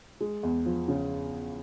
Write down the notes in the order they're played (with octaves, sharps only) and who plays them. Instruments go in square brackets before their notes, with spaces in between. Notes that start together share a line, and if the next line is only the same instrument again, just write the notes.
[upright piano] G#3
E2
F3
C#3